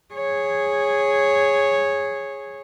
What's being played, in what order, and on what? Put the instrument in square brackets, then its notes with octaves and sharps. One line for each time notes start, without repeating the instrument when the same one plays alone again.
[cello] G#4 C#5